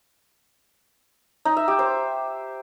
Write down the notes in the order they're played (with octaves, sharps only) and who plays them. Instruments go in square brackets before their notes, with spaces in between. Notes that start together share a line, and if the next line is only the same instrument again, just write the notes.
[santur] D#4
E5
G4
C5